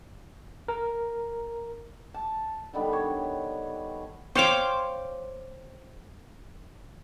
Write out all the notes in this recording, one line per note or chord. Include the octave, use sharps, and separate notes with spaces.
A#4
A5
D3 D#3 G3 B3
C#5
C5 C#5 F5 G5 C6 D6